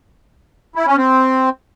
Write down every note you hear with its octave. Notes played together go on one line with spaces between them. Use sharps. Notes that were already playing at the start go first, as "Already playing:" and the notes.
E4
C#4
C4